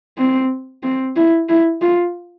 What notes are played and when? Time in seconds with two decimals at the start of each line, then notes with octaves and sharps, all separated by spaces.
0.18 C4
0.83 C4
1.16 E4
1.49 E4
1.82 F4